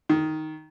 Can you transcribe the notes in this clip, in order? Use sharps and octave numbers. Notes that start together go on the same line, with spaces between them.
D#3